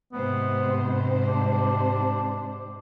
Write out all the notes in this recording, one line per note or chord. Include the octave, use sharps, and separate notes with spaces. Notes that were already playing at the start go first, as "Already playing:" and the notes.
G#2 C3 B3 C5
D4